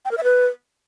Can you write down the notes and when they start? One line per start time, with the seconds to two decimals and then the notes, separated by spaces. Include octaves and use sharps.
0.05 G5
0.11 A#4
0.18 E5
0.24 B4